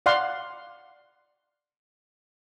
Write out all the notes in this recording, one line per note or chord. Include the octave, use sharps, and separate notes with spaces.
D5 F5 F#5 C6